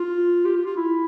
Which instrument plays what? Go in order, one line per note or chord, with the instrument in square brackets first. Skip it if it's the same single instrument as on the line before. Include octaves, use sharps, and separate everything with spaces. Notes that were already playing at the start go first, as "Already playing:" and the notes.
Already playing: [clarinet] F4
G4
F4
F4
E4